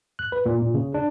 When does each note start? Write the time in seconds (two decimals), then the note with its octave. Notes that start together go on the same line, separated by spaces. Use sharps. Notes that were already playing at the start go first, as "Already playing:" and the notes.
0.19 F#6
0.32 B4
0.46 A#2
0.62 A#2
0.74 C#3
0.94 D4